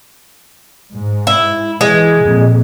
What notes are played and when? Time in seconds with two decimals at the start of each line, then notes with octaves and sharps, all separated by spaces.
0.93 G#2
1.27 E4
1.81 E3 G#3
2.22 F2 A#2